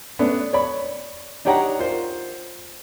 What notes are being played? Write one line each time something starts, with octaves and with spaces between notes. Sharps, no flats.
A3 B3 C#4 D4
C#5 D5 B5
D4 D#4 G4 C#5 F#5 A#5
F4 A#4 C5